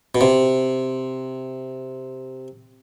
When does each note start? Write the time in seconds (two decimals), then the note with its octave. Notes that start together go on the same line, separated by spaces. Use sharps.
0.15 B2
0.21 C3